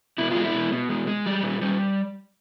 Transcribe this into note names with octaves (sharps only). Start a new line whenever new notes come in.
B2 E4
G#3 F4
E4
B2
B2
G#3
G#3
G3
A#2
G3